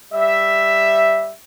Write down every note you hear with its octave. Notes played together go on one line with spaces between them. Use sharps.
G3 E5